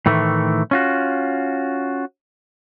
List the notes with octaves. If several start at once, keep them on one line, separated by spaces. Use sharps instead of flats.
A2 D#3 E3 A3
C#4 F4 F#4